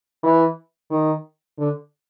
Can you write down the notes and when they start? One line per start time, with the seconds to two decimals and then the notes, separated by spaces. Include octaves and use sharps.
0.23 E3
0.90 D#3
1.59 D3